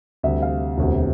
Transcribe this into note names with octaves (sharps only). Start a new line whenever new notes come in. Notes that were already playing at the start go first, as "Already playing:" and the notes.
D2 C3 G3 E5
F5
E1 D2 C3